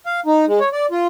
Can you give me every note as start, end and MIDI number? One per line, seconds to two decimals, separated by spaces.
0.06 0.20 77
0.26 0.45 63
0.48 0.59 56
0.60 0.69 73
0.73 0.86 74
0.91 1.07 65